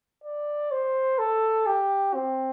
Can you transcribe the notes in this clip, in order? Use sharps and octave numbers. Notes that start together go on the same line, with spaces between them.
D5
C5
A4
G4
C4